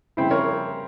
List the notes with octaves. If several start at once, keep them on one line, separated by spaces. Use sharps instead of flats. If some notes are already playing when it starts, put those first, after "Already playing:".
C#3 E3 G3 C4 E4
A#4 C#5